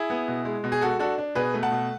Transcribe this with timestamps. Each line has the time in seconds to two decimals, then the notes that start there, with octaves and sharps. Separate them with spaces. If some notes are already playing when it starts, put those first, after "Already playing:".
Already playing: E4 G#4
0.10 B3
0.28 B2
0.45 G#3
0.64 B2
0.72 G#4
0.81 G#3 F#4 A4
0.99 D4 F#4 A4
1.18 D4
1.35 B2 G#4 B4
1.54 A3
1.63 F#5 A5
1.72 B2